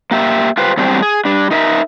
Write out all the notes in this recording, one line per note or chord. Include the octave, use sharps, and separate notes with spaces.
A#3 G4 E5
F4 G4 B4 C5
E2 F#3 G3 C4 D4 C5
G#4
G3 D4
D#4 A#4 E5